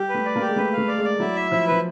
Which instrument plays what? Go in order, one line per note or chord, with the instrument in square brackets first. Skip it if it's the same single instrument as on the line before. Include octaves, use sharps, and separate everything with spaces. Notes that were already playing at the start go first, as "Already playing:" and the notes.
Already playing: [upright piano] G3 [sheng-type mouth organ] G4
[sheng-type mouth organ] B4
[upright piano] A3
[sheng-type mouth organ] D5
[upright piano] A#3
[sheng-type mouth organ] G4
[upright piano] G#3
[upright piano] A3 [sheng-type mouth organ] B4
[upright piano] A3 [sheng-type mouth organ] F5
[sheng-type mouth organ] D5
[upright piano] G#3
[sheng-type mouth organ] D5
[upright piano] F#3 [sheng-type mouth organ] E4
[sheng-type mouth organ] E5
[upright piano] F3 [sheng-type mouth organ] E4
[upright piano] F3 [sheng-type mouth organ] B4